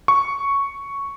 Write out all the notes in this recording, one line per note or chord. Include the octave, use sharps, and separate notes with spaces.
C#6